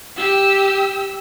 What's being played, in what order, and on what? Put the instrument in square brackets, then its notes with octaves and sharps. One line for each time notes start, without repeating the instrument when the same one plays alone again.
[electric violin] G4 E6